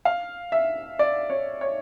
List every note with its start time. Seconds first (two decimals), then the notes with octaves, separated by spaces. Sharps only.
0.05 F5
0.52 E5
0.99 D5
1.30 C#5
1.61 C#5